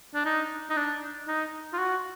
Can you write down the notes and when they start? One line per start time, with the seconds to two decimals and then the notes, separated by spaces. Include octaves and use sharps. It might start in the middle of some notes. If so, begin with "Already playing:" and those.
0.14 D4
0.25 D#4
0.69 D#4
0.76 D4
1.27 D#4
1.73 F4
1.78 F#4